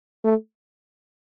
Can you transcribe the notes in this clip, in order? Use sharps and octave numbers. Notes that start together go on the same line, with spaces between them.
A3